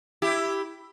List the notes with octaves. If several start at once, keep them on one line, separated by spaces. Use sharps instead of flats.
E4 G4